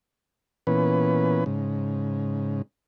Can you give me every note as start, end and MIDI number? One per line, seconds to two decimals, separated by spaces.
0.67 1.44 46
0.67 1.44 52
0.67 1.44 59
0.67 1.44 61
0.67 1.44 71
1.46 2.62 44
1.46 2.62 49